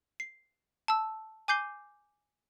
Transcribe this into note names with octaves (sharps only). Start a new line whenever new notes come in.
C7
A5 E6
G#5 D6 G6 C7 G7